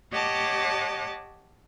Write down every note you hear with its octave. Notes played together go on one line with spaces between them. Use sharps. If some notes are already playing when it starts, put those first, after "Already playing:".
G4 C#5 D#5 F#5 A5 D6